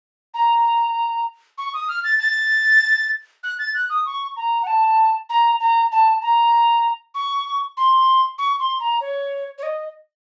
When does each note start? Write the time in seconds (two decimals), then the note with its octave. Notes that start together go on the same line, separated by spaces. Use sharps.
0.34 A#5
1.58 C#6
1.74 D#6
1.89 F6
2.04 A6
2.19 A6
3.43 F#6
3.59 A6
3.74 F#6
3.90 D#6
4.06 C#6
4.37 A#5
4.62 F#5
4.67 A5
5.30 A#5
5.60 A#5
5.92 A5
6.22 A#5
7.15 C#6
7.77 C6
8.38 C#6
8.59 C6
8.80 A#5
9.01 C#5
9.58 C#5
9.63 D#5